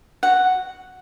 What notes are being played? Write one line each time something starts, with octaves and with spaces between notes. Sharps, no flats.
F#4 F#5